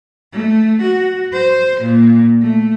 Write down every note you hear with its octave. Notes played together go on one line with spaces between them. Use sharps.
A3
F#4
C5
A#2
A3